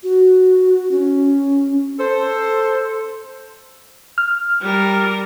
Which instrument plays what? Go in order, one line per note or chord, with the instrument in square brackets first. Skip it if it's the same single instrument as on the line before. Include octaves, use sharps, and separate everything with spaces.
[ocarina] F#4
C#4
[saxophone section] A4 C5
[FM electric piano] F6
[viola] G3 A#4